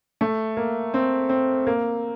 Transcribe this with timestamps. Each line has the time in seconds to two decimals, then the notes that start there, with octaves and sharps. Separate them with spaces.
0.21 A3
0.57 A#3
0.94 C4
1.29 C4
1.67 A#3